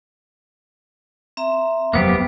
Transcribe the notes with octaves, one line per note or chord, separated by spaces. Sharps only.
C4 E5 A#5
F1 F#3 A#3 B3 G4 C5